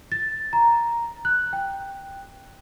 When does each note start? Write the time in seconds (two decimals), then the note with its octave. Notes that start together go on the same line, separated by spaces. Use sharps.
0.12 A6
0.53 A#5
1.25 F#6
1.53 G5